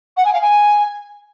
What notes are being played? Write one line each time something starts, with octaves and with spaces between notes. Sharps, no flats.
F#5
G#5
F5
G#5